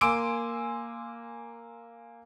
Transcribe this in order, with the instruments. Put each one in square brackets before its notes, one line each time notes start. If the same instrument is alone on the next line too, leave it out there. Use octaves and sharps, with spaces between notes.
[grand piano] A#3 G#5 C6 D6 E6 D7